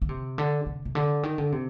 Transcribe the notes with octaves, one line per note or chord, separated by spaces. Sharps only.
D3
C3
D3
C3
C3
D3
D#3
D3
C3